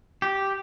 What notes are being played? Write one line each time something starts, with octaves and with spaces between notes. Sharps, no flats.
G4